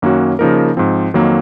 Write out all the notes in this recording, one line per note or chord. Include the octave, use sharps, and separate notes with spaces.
F#2 D#3 A#3 C#4 F#4
C#3 F3 A#3 D#4 A#4
G#2 F3 C4
F2 D#3 F#3 A#3